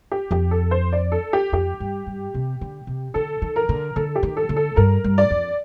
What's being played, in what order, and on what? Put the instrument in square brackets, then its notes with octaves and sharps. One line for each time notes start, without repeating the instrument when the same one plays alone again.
[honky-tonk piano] G4
[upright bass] F2 [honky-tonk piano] G4
[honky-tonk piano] A4
C5
D5
A4
G4
[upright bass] F2 [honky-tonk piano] G4
[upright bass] G2
G2
C3
D3
C3
[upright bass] D3 [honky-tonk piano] A4
[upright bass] D#3
[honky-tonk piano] A#4
[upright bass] D3
[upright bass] D3 [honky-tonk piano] A4
[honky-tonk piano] G4
[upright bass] D#3
[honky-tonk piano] A4
[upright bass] D3
[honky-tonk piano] A4
[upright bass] G2 [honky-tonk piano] A#4
[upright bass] G2
[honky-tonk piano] D5
[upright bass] F2